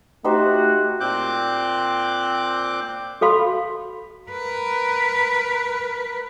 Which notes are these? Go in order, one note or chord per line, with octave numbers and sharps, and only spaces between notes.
A3 D#4 F#4 G4 C5
A#2 C4 D6 F#6 G6
F#4 A4 F5 B5 C6
A#4 B4